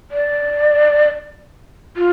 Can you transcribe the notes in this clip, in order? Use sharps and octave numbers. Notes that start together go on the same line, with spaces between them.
D5
F4